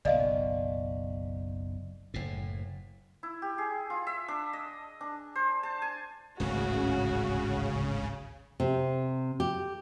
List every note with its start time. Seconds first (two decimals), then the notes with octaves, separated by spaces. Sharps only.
0.05 F#1 B1 D5 D#5 F5
2.14 F#1 A2
3.23 E4
3.42 G4
3.58 G#4
3.90 F4
4.07 E5
4.28 D4
4.53 D#5
5.01 D4
5.35 C5
5.63 A5
5.82 G#5
6.40 D1 G#1 C#2 C#3 F#4
8.60 C3
9.40 G4